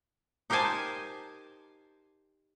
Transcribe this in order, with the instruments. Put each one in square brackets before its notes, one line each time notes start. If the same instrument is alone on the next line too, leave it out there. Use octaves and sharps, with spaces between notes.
[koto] D#4 G4 A#4 C5 G#5 A5